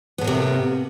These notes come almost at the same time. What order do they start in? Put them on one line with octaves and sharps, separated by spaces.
B3 A2 A#3 C3